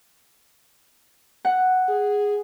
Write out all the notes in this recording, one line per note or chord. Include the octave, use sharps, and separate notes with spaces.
F#5
G#4